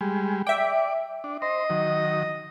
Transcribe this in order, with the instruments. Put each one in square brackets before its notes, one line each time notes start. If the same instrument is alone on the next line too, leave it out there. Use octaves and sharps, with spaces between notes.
[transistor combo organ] G3 G#3
[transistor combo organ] D5 [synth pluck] E5 G5
[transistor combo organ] D4
[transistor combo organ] C5 [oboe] D#5
[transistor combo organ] D#3 F#3